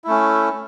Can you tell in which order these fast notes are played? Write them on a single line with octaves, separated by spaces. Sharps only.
E4 A3 C#4